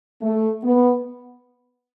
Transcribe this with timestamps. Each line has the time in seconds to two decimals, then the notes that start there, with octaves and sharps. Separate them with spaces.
0.22 A3
0.63 B3